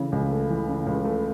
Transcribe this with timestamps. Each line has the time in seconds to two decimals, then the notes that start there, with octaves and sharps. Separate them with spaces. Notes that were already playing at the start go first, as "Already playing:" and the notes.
Already playing: C#3 E3 A3
0.12 C#2
0.31 A3
0.50 E3
0.68 C#3
0.87 C#2
1.05 A3